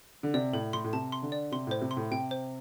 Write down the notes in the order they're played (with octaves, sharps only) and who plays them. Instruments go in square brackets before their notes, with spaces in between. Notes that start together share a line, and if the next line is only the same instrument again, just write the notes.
[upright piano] D3
[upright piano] C3 [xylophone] D5
[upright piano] A2 [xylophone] A4
[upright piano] A2 [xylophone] C6
[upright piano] A2
[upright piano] C3 [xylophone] A5
[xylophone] C6
[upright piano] D3
[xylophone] D5
[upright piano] C3 [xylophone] C6
[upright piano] A2 [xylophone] C5
[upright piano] C3
[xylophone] C6
[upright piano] A2
[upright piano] C3 [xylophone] G5
[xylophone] C5